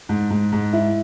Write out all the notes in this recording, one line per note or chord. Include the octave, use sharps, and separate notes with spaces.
G#2
G#2
G#2
E4